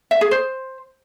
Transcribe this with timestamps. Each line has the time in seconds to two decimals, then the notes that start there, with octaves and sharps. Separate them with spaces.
0.11 E5
0.21 G#4
0.31 C5